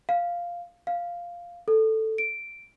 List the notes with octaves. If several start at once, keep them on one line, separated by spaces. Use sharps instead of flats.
F5
F5
A4
D7